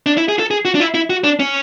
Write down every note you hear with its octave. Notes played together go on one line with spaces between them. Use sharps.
D4
E4
G#4
A4
G#4
F#4
D4
E4
E4
F#4
D4
C#4